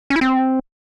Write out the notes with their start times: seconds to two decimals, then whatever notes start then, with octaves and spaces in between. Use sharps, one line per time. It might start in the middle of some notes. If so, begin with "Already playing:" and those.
0.10 C#4
0.16 E4
0.21 C4